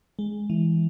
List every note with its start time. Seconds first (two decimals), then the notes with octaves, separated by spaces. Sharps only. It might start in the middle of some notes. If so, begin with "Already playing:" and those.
0.19 G#3
0.50 E3